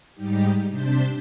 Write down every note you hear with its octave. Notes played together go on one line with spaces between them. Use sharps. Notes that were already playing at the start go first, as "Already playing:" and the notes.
G#2 G3 D#4 G4
C3 D4 C5 A5 G6 B6